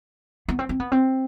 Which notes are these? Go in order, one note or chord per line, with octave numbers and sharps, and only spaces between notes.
B3
C4
C4
B3
C4